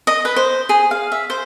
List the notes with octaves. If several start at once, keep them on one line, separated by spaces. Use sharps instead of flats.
D#5
B4
C5
G#4
F5
E5
C5